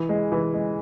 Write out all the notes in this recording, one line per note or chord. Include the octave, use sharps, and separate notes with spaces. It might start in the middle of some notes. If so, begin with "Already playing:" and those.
Already playing: E3
G#3
E3
G#3